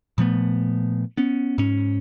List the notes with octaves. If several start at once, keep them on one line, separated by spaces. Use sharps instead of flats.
A#2 F3 A3 B3
B3 C#4
G#2 C#4